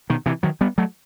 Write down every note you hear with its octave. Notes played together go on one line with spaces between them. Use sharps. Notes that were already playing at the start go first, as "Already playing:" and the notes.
B2 D#3
C3 E3
D#3 F#3
G3 B3
F#3 A3